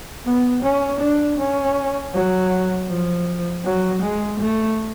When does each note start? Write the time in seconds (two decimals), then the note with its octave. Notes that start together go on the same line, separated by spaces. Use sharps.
0.25 B3
0.63 C#4
1.00 D4
1.38 C#4
2.14 F#3
2.89 F3
3.64 F#3
4.02 G#3
4.40 A3